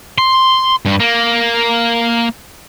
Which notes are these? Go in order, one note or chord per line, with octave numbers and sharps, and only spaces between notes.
C6
G2
A#3